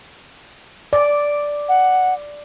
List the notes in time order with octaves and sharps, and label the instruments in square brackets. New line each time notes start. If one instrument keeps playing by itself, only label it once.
[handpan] D5
[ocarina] F#5